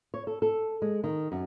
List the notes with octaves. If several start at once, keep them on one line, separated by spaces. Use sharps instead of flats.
C#5
A4
A4
G#3
D#3
F#2